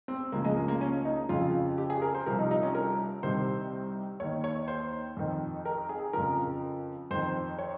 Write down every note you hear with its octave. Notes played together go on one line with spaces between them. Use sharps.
C4
C#2 C#3 F3 A#3
G#3
A#3
A#3
C#4
D#4
F2 C#3 F3 F4
G4
G#4
A#4
C5
C2 C3 F3 A#4
D#4
D#4
C#4
A#4
C2 C3 D#3 C5
D#2 D#3 C#5
C#5
C5
F2 D#3
A#4
G#4
F2 C#3 F3 A#4
F2 D#3 C5
C#5